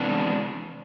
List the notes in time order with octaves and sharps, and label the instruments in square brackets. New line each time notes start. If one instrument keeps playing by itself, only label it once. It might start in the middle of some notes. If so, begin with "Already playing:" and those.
Already playing: [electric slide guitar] C3 E3 G#3 B3 D4